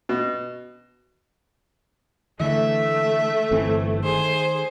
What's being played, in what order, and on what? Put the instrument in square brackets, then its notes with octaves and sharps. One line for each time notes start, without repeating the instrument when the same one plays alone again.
[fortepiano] B2
[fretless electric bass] D3 E3 [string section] A3 [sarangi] E5
[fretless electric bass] G1 E3 C4
[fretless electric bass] D#3 [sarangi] G#4 [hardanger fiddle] C5